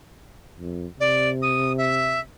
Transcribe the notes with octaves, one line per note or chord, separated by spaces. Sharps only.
F2
C3 D5
D#6
E5